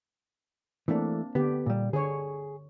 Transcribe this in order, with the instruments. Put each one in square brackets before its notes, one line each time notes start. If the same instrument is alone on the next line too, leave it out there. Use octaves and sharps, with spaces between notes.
[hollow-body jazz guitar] E3 A3 [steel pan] A#3 C4 D4
[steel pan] D3 G4 [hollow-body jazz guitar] B3
[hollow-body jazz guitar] A#2 G3
[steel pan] D3 C#5 [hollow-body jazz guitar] G#4